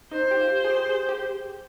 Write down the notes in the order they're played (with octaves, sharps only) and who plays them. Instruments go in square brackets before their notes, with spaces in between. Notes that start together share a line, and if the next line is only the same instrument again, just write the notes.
[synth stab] D#4 [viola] C5
[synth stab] G4
F4
G#4
G4
G#4
G4